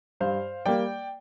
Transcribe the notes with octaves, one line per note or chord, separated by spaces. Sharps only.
G2 C5 F5
G3 A#3 D5 G5